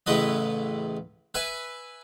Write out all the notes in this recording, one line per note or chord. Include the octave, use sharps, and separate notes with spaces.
A1 C#3 E4 B4 D#5
B4 E5 G#5